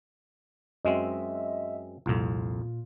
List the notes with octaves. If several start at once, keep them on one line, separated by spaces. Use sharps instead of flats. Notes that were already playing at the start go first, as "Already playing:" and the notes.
F#2 G#3 C4 D#5 E5
C2 F2 A#2 F4